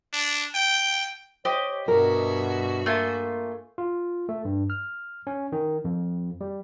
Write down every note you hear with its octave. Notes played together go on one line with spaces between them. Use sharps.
D4
G5
G4 C5 C#5 D#5
G2 B2 F#4 A#4 E5
A3 A#3 F4 G#5
F4
A3
G2
F6
C#4
D#3
F2
G3